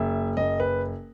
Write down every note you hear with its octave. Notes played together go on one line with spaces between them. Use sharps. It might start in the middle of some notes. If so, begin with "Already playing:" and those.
Already playing: F#1 E5
F#1 D#5
B4